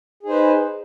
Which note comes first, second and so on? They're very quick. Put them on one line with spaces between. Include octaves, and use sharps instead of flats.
G#4 D#4 C5 B4